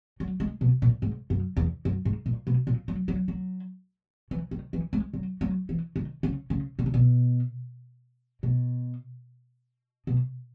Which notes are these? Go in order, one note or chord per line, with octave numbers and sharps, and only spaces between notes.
F#3
G#3
B2
A#2
G#2
F#2
E2
F#2
G#2
A#2
B2
A#2
F#3
F#3
F#3
E3
D#3
E3
G#3
F#3
F#3
E3
D#3
C#3
C#3
B2
C#3
B2
B2
B2